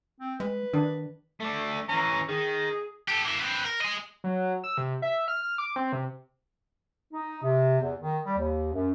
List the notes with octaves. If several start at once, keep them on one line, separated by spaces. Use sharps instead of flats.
C4
G#3 B4
D#3 D4
A3 D4
E3 C#4 A#5
D#3 G#4
G4 A4
A#3 E4
C4 B4
A#4
G#4 D#5
F#3
E6
C3
E5
F6
F6
D6
C4
C3
D#4
C3
E2
D#3
G3
D#2
F#2